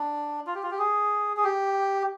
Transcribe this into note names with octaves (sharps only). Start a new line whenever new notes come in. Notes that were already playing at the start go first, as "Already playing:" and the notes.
Already playing: D4
F4
G4
F4
G4
G#4
G#4
G4